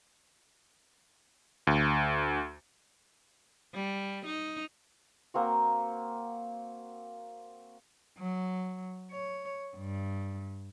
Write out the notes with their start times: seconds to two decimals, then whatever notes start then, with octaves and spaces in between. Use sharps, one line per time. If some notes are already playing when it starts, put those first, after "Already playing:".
1.67 D2
3.74 G3
4.25 D#4
5.34 A#3 C4 F#4
8.19 F#3
9.12 C#5
9.76 G2